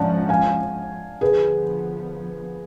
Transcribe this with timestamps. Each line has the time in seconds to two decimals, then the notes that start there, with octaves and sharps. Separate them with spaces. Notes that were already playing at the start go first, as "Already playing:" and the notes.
Already playing: F3 G#3 C#4 D5 F#5 A5
0.29 F5 G#5
1.21 D3 F3 B3 G#4 B4